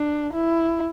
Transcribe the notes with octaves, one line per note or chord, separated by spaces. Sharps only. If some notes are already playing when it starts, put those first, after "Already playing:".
Already playing: D4
E4